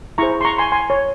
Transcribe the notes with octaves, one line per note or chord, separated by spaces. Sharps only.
E4 G#4 C5 A#5 C#6
C6
A#5 C#6
G#5 C6
G#5 C6
C#5